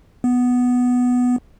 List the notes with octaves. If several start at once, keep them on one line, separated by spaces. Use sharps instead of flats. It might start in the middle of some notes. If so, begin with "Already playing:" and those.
B3